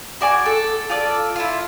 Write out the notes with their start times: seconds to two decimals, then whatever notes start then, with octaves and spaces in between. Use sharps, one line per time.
0.21 F#4 D5 G#5 D6
0.46 A4
0.89 F4 A4 D5
1.36 E4 F4